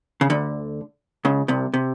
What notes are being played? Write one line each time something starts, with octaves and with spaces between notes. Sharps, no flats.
C#3
D2 D3
C#2 C#3
C2 C3
C3